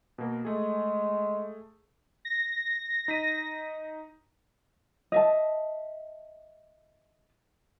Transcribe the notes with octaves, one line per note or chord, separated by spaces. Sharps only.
B2 A#3 A#4
G#3 A3 G#4
A#6
D#4 B6 D#7
D#5 E5 A5